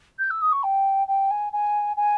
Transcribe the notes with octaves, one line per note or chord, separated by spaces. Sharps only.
G6
E6
D#6
C#6
G5
G5
G#5
G#5
G#5